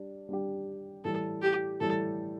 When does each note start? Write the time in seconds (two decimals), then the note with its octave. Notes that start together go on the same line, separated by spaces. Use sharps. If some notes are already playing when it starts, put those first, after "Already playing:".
Already playing: G3 D4 G4
0.29 G3 D4 G4
1.04 A2 E3 G3 A4
1.42 G4
1.80 A2 E3 G3 A4